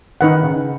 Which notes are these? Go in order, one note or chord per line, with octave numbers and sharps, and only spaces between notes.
D#3 D#4 B4 F#5
C#3